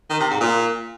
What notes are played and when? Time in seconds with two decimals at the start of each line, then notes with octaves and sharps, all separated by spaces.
0.10 D#3
0.20 C3
0.30 G#2
0.40 A#2